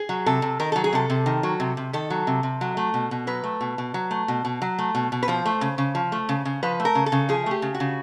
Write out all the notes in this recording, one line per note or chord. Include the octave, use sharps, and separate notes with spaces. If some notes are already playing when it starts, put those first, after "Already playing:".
Already playing: G#4
F#3
C3 A4
C3
D#3 A#4
F#3 A4
G#4
C3 A4
C3
D#3
F#3
C3
C3
D#3 A4
F#3
C3
C3
F#3
A3
B2
B2
F#3 B4
A3
B2
B2
F#3
A3
B2
B2
F#3
A3
B2
B2
B4
F3 C5
A3
C#3
C#3
F3
A3
C#3
C#3
F3 B4
A3
A#4
C#3
A4
C#3
F3 G#4
A3 G4
C#3
F#4
C#3